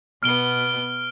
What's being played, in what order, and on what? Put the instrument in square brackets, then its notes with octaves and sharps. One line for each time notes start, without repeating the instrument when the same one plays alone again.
[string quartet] B2 B3 [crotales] F6 D7 G7